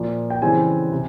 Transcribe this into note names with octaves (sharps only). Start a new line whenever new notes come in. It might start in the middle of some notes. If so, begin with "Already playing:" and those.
Already playing: A#2 F3 A#3
G5
C#3 E3 G3 C4 G#5
C3